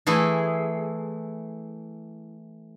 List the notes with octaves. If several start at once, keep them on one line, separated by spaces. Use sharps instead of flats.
E3 A3 E4 G#4